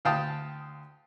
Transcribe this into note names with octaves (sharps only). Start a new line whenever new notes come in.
D2 F5 G5 A5 D#6